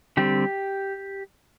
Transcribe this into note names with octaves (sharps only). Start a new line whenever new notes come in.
D3 G3 C4 G4